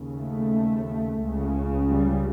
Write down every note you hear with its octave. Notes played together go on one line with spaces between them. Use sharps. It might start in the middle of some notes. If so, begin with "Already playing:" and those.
Already playing: D#2 C#3
A3
C#2 C#3
G3